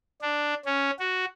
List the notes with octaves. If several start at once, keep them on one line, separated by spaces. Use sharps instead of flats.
D4
C#4
F#4